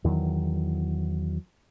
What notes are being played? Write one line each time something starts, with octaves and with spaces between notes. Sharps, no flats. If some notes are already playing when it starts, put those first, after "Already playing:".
E2 D#3 E3 F#3